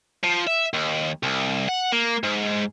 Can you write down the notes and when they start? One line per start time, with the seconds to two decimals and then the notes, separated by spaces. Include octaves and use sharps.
0.23 F3
0.47 E5
0.73 D#2
1.23 C2
1.68 F#5
1.92 A#3
2.24 G#2